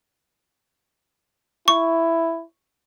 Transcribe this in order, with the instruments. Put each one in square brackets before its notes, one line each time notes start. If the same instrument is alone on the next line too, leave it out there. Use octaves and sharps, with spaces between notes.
[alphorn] E4 [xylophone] C#6